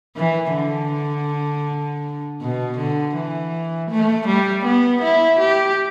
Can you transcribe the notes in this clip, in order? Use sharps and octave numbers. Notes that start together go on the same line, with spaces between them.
E3
D3
B2
D3
E3
A3
G3
B3
E4
G4